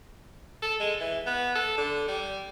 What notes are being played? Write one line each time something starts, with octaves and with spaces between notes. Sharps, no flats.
A4
G#3
E3
B3
A4
D3
G3